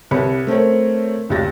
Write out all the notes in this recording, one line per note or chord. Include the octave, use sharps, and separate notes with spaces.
C2 G4 B4 C#5 B5 C#7
A3 C4 A#4 C#5
F1 C#2 C#3 G4 A6 A#6